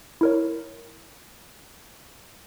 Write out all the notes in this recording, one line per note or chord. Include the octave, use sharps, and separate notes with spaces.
E4 A#4 C#5